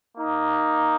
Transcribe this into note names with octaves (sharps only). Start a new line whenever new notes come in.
A#3 D#4